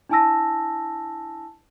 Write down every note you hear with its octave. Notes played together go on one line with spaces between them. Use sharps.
D4 E4 G#5 A5 E6 A#6